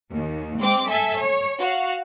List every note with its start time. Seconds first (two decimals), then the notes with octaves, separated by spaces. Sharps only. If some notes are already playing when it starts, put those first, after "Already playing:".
0.13 D#2
0.59 G#3 C4 D6
0.88 A4 E5 G#5
1.22 C#5
1.60 F#4 F5